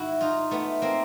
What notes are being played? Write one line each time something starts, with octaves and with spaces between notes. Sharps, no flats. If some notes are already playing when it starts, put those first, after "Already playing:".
Already playing: G#2 D#3 E4 F#4
D#4 F4
A3 B3
A#3 C4